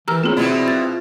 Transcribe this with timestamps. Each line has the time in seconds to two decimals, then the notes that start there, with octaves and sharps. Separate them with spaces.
0.08 E3 G4 A#4 A#5 E6 F6
0.24 A#3 C4 E4 F4 G#4 C#5
0.37 B1 B2 E4 D5
0.68 F4 A6